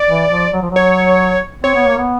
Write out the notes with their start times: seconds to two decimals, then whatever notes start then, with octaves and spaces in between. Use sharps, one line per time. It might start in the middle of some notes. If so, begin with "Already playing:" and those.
Already playing: D5
0.09 E3
0.31 F3
0.53 F#3
0.62 F3
0.71 F#3 C#5
1.64 C4 C#5
1.75 B3
1.87 A#3
1.98 B3